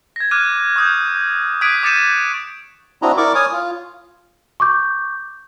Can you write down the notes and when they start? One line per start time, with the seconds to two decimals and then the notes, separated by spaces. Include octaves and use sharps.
0.16 G#6 A#6
0.31 D6 F6 F#6 G#6 D#7
0.76 C#6 D#6 G6
1.15 G6
1.61 D#6 F#6 G#6 B6 D7 D#7
1.83 D6 G6 A6 C#7 D#7 E7
3.02 C4 D4 E4 F#4 D#5 A#5
3.17 E4 A#4 D5 C#6 D6
3.35 C#5 G#5 D#6 F6
3.52 F4
4.60 C#6 D6 G6